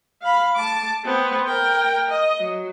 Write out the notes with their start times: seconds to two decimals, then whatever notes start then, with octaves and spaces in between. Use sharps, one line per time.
0.22 F5 B5
0.56 A5 D6
1.05 B3 C4
1.47 A#4 G5
2.10 D#5
2.39 F#3